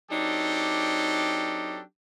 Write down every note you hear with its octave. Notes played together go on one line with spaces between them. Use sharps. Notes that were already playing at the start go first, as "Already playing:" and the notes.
F#3 C4 D4 D#4 G4 A4